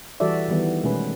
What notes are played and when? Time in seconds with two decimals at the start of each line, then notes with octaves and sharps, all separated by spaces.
0.20 E3 G3 F#4 A4 D5 E5
0.48 D#3 E3 G3 B3
0.84 B2 G#3 A3 C#4 B4